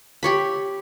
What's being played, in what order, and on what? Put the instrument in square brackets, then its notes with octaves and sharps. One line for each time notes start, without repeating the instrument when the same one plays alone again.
[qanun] G4 C#5 B5